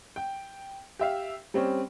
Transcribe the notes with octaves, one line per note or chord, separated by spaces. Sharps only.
G5
G4 E5 F5
G3 C4 C#4